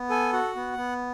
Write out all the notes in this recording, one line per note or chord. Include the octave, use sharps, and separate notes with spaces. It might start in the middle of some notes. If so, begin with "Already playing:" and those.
Already playing: B3
A4 G#5
F#4 F#5
B3
B3